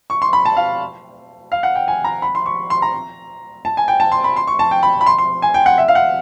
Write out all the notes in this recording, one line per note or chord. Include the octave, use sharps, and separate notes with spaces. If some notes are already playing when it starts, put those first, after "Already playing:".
C#6
C6
B5
A5
F5
F5
F#5
G5
G#5
A#5
B5
C6
C#6
C6
A#5
A5
G#5
G5
A5
C6
B5
C6
C#6
A5
G5
B5
B5
C6
C6
G#5
G5
F#5
E5
F5
F#5